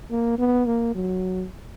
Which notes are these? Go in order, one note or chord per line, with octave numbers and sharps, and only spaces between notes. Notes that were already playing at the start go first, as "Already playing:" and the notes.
A#3
B3
A#3
F#3